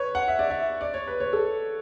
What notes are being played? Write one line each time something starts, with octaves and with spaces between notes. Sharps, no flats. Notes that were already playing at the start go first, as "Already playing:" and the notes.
Already playing: B4 C#5
F#5
E5
D5
E5
D5
C#5
B4
C#5
A4